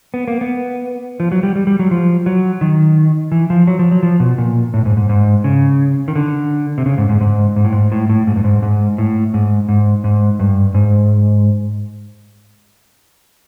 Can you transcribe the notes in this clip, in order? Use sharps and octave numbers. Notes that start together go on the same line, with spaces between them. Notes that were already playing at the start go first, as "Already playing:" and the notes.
B3
A#3
B3
F3
F#3
G3
G3
G3
F#3
F3
F#3
D#3
E3
F3
F#3
F3
F#3
F3
B2
A#2
A2
G#2
G#2
G#2
C#3
D#3
D3
C3
C#3
G#2
G#2
G#2
G#2
A2
G#2
A2
A2
G#2
G2
G#2
G#2
A2
G#2
G#2
G#2
G2
G#2